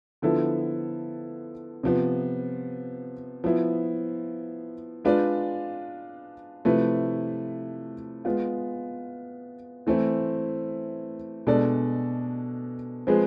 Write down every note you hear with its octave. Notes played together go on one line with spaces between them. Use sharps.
D3 F3 B3 E4 A4
C3 F3 B3
F3 B3 E4
G#3 D4 F4 B4 D5
C3 F3 A3 E4 B4
G#3 B3 F4
E3 A3 C4 E4
B2 G#3 D4 A4 D5
F3 G#3 C4 G#4 B4